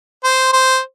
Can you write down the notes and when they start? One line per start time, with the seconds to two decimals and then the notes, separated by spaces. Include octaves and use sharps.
0.24 C5
0.53 C5